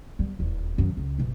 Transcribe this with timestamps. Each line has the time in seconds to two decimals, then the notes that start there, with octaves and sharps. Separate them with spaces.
0.19 G3 B3
0.39 D#1 E2
0.78 F#2 D#3
0.97 C#2
1.19 G1 B2